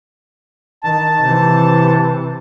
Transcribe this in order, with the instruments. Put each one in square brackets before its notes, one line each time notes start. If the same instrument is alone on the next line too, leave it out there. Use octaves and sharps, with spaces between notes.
[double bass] D#3 [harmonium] A5
[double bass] C3 E3